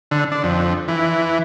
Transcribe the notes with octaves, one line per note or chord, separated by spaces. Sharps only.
D3
D4
F2
E3